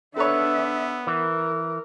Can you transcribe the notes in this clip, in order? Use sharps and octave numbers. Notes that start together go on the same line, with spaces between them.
B3 D4 A4 B4 C#5 E5
E3 A#4